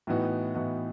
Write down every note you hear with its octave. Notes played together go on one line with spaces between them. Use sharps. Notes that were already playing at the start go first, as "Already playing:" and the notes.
A2 E3 B3 D#4 F#4
A2 E3 B3 D#4 F#4